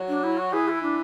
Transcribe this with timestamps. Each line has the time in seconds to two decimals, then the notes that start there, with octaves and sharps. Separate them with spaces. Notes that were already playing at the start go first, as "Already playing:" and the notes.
Already playing: F#3
0.08 D4
0.23 E4
0.37 F#4
0.53 E3 G#4
0.68 E4
0.83 D4